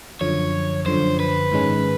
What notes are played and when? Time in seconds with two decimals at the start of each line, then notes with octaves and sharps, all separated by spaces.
0.21 F#2 D3 F3 C#5
0.86 F#2 D3 F3 C5
1.20 B4
1.52 G#2 D#3 G#3 C#4